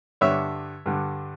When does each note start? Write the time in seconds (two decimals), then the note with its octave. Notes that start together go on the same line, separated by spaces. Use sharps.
0.21 G2 D3 C#5 E5
0.86 G2 D3